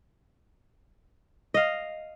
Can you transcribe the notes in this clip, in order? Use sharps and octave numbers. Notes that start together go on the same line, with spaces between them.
D#5 F5